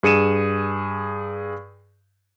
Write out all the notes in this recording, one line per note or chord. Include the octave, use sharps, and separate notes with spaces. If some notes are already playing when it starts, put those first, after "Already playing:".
G2 G#4 C#7 D#7 E7